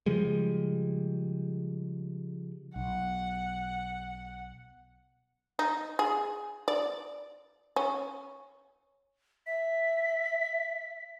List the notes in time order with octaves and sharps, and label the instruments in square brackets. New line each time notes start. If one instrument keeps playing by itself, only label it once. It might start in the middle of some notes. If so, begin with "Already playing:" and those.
[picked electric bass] C#3 F3 G3 G#3
[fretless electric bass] B1 [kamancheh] F#5
[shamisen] D#4
G#4
D5
C#4
[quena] E5 [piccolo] B6